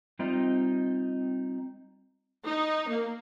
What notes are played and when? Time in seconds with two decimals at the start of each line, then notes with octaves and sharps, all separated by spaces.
0.19 G3 C4 D#4 F4 D#5
2.45 D#4
2.89 A#3